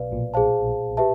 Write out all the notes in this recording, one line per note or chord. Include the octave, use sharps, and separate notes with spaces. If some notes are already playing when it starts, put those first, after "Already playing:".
Already playing: B1 B2 B4 D5 F5
A#1 A#2
G#4 C5 F5 A5
G4 B4 E5 A5